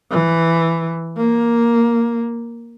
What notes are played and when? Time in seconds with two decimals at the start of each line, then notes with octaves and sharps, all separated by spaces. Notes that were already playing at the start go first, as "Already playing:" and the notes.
0.11 E3
1.17 A#3